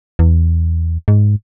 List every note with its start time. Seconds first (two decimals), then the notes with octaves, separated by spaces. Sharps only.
0.19 E2
1.08 G#2